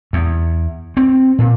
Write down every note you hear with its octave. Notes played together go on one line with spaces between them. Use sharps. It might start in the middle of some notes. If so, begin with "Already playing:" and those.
E2
C4
A#2